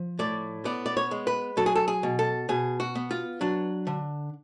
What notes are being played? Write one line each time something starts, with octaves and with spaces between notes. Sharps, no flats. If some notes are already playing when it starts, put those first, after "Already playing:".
Already playing: F3
A2 D5
B3 D5
D5
C#5
G#3
B4
F#3 A4
G#4
A4
G#4
B2
A4
B2 G#4
F#4
B3
F4
F#3 D4
D3